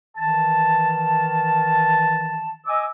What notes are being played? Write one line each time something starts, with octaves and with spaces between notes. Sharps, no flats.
D#3 E3 A5
D#5 G#5 D6 E6